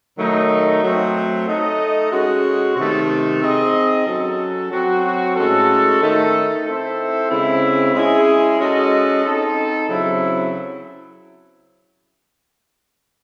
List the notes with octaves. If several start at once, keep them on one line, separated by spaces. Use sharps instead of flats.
D#3 F#3 A3 D#4
F#3 A3 C4
A3 D#4 A4 D#5
G#3 C#4 F#4
C3 D#3 A3
C4 D#4 G#4 D#5
F#3 C#4 F#4 A4
F#3 C4 F#4
A2 G#3 C#4 F#4 A4
D#3 A3 D#4 A4
C4 E4 A4 C5 E5
C#3 G#3 C4 E4
G#3 C#4 E4 G#4
G#3 C#4 F#4 A4 D#5
C4 D#4 A4
C#3 F#3 C4 E4